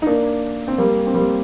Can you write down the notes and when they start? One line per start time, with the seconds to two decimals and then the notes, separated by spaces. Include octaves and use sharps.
0.02 D#4
0.07 A#3 D4
0.68 C4
0.78 G3 A#3
1.07 C4
1.14 G3 A#3